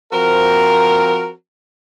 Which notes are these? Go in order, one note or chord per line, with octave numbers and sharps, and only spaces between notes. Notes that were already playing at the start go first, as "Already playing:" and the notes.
F3 C4 F#4 A#4